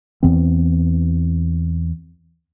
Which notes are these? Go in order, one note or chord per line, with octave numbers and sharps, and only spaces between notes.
E2 E3 B3 C4